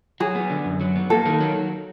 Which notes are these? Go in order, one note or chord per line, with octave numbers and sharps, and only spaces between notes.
F#3 G#4
B3
D3
F#2
F#3
B3
A#3 A4
D#3
F#3